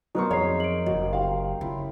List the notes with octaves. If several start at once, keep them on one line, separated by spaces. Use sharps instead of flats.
F#3 B3 D#4 A#4 C5 C#6
F2 G#4 C#5 A#5 C7
D7 F#7
F#1 F#4 D#5
G4 F5 G5
C#3 E4 F4